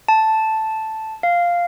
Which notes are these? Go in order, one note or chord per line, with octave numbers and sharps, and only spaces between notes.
A5
F5